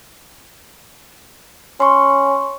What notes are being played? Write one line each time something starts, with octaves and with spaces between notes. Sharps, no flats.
C#4 C6 C#6